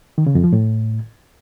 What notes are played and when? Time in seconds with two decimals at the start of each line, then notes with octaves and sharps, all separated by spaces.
0.18 D#3
0.26 C#3
0.35 F2
0.44 F3
0.53 A2